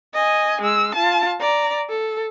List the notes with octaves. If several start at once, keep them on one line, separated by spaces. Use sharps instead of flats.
D#5 G#5
G#3 E6
F4 A5
D5 A#5
A4